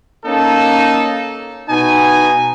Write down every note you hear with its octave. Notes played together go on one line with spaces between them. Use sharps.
A#3 C#4 D#4 A4
B2 D#4 G#5